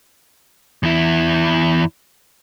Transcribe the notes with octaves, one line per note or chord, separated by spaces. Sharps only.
E2 E4